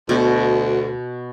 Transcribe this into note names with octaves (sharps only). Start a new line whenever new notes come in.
D2 B2